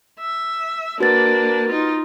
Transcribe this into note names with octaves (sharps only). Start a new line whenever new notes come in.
E5
A#3 D4 F#4 B4 A6
D#4 F4